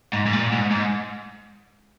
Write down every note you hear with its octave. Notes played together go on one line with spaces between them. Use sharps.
G#2
G#2
A#2
G#2
G#2